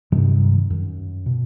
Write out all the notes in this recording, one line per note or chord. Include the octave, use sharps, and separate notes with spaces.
G2 C3 D#3 F#3
F#2
B2